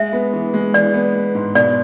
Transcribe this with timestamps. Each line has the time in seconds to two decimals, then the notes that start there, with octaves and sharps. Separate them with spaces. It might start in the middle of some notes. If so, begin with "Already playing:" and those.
Already playing: G#3 E5
0.13 B3
0.33 E3
0.54 G#3
0.73 E3 D5
0.94 B3
1.14 B3
1.35 G#2
1.55 B2 D5